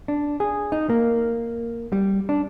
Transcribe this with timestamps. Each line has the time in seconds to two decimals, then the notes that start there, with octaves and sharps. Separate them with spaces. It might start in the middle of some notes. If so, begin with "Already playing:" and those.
0.08 D4
0.40 G#4
0.72 D#4
0.90 A#3
1.92 G3
2.29 D4